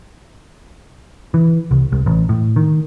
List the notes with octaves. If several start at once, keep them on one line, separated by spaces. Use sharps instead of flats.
E3
C2
C2
A1
A2
D#3